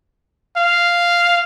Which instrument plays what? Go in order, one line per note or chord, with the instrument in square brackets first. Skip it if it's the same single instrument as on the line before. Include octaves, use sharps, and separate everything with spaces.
[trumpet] F5